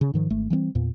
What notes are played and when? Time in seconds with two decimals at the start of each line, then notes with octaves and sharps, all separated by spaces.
0.01 C#3
0.14 G#2 D#3 F3
0.30 G#1 A3
0.50 E3 G3 A#3 C4
0.75 E2 A#2